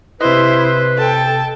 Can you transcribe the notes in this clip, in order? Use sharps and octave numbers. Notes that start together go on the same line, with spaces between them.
C3 E4 B4 C5 D#5
A4 G5 A5